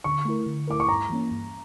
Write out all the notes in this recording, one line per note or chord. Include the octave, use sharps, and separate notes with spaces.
D3 C#6
A3 E4 A#4
D3
A3 E4 A#4 D6
C#6
G2 A#5
E3 A#3 C#4
G2